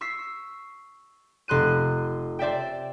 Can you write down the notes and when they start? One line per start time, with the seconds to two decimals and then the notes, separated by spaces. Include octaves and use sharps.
0.01 C#6 E6 B6 C7
1.48 F1 C6 F#6 D#7
2.39 C5 D5 E5 G5